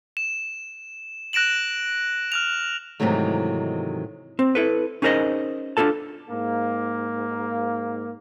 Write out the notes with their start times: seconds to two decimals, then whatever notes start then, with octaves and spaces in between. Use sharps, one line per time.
0.17 E7
1.33 F#6 A#6 D7 E7 F#7
2.32 F6 F#6 F7
3.00 G#2 C3 D#3 E3 F#3 A3
4.39 C4
4.55 E4 A4 B4
5.02 C#4 D#4 G#4 A#4 C5 D#5
5.77 D4 D#4 F4 A4 A5
6.30 G#2 A#3